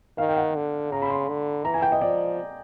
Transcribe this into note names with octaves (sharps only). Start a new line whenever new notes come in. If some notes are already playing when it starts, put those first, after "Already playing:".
D#3 F5
G5
F#5
D3
C#3 A#5
B5
C6
D3
E3 A#5
G#5
G5
D#5
F3 D5